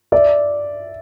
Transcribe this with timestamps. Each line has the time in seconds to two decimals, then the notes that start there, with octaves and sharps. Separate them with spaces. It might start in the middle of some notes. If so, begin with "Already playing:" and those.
0.12 D5 E5